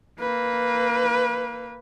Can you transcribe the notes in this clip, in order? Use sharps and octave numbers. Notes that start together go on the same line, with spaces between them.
A#3 B4